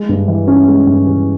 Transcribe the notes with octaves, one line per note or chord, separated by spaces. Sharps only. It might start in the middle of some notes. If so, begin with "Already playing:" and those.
Already playing: G#3
G2
E3
C#4
G#3
G2
E3